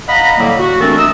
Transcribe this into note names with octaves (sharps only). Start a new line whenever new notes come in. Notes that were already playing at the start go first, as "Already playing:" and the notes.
D#5 F5 F#5 A#5 B5
A2 D3 F#3 G3 A#3
F#4
E3 A3 C4 D4 A4 A#4
D#5 E5 A#5 D#6 E6